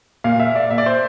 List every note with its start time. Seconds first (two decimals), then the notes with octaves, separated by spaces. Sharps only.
0.24 A#2 F5
0.40 E5
0.55 D5
0.71 A#2 E5
0.78 D5
0.86 C5